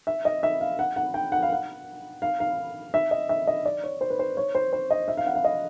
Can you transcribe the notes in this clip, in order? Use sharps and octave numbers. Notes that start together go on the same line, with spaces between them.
E5
D#5
E5
F5
F#5
F#5
G5
F#5
F5
F#5
F5
F5
E5
D#5
E5
D#5
D5
C#5
C5
B4
C5
C#5
C5
C5
D#5
E5
F5
F#5
F5
D#5